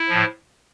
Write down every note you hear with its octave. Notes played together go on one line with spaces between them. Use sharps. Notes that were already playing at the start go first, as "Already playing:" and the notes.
Already playing: E4
A2 F3